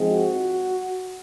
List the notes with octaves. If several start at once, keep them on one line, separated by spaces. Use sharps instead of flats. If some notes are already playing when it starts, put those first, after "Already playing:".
Already playing: G#2 F3 G#3 C4
F#4